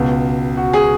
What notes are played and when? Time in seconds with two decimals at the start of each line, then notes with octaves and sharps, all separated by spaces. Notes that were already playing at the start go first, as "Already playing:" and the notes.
Already playing: C#2 B2
0.57 F#4
0.73 G#4